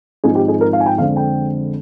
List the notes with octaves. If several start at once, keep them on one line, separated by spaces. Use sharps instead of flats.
G#1 G#2 F3 G#3 G#4
G4
G#4
A#4
F5
G#5
G5
F2 D3 G#3 C4 F5
G5